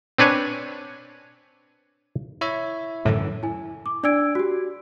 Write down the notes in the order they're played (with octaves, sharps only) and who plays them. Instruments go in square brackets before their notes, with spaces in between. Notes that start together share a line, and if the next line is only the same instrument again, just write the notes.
[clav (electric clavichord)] C4 D4 B4 C#5 G#5
[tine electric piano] E4 C#5 E5
[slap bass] F#2 D3 E3 [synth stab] A2
[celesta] E4 G#5
D6
D4 D5 G#5 E6 G#6 D7
F#4 G4